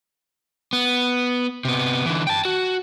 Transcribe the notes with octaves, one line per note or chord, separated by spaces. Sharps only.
B3
C3 B3
D3 E3
G5 A5
F#4